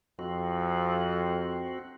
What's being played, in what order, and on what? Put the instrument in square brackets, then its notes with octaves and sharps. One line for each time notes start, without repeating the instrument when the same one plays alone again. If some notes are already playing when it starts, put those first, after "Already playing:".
[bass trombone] F2 [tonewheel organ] C4 F#4